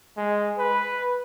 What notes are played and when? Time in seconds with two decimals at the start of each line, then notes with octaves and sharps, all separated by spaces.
0.17 G#3
0.58 B4